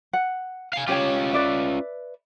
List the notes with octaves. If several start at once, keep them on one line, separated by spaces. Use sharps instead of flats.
F#5
F5 G#5
C#4 F4 G4 C#5 G5
B4 D5 E5